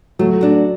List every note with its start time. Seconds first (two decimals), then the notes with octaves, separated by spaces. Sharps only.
0.19 F#3 A3
0.41 D4 F#4